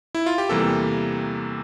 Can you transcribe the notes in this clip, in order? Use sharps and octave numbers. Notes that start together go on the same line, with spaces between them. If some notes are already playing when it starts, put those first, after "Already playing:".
E4
F4
G4
E2 C3 E3 G3 A#3 A4